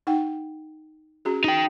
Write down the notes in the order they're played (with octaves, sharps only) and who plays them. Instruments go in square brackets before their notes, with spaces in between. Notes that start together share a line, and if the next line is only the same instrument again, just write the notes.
[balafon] D#4 F#5 G5
C#4 F#4 G#4
[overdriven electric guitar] D#4 G5